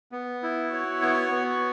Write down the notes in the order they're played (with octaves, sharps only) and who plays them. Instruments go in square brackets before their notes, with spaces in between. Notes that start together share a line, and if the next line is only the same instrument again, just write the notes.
[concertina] B3
E4
[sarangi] F#4 [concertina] C#5
[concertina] B3
B3